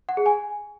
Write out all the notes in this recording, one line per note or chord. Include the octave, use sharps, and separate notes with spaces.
F#5
G#4
G#5